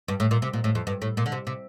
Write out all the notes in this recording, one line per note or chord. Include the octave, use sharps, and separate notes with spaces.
G2
A2
A#2
C3
A#2
A2
F2
G2
A2
A#2
D3
C3
C3